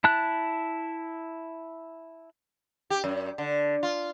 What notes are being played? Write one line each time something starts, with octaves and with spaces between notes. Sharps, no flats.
E4 A5 F#6
G4
F#2
D3
F4